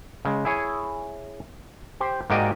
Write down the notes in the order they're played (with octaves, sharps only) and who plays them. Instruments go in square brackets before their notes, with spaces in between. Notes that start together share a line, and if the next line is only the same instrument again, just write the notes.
[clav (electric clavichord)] C#3 G#3
E4 G#4 C#5
G4 C5
G#2 A#3 F#4 G4 D5 D#5